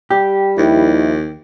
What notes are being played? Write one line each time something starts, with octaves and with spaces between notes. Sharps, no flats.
G3 G4
D#2 D#3 F3 E4